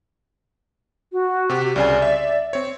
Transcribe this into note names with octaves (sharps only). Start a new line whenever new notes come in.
F#4
C3 G4
C2 C#3 D5 G#5
E5
C4 C#5